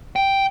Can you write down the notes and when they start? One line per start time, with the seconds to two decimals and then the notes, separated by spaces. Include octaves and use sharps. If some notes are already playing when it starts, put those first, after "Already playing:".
0.16 G5